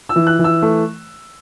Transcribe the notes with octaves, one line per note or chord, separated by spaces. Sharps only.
E6
E3
F#6
E3
E6
A3